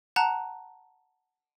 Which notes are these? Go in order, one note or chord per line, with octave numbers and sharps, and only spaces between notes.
F#5 A5 A#5 F#6